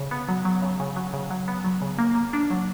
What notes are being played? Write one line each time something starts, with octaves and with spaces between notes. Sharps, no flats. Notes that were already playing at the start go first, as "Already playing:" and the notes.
Already playing: C#3
B3
F#3
F#3
C#3
C#3
F#3
C#3
F#3
B3
F#3
C#3
A#3
A#3
D4
F#3